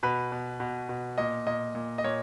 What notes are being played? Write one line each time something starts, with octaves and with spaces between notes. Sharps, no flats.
B2 B4
B2
B2
B2
A#2 D#5
A#2 D#5
A#2
D#5
A#2 C#5